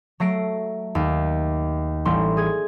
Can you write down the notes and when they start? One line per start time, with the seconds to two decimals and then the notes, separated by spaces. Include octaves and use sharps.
0.20 F#3 A3 A#6 C7 D7
0.95 D#2
2.05 A1 G3 C6
2.37 G#4 G#6